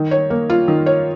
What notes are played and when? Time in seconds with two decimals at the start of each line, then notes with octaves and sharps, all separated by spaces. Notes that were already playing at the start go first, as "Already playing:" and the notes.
Already playing: D#3
0.11 C#5
0.30 A#3
0.50 F4
0.68 D#3
0.86 C#5